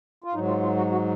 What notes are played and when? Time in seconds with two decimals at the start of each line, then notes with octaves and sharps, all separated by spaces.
0.24 F4
0.34 G#2 F#3 D#4
0.48 F4
0.63 F4
0.77 F#4
0.92 F#4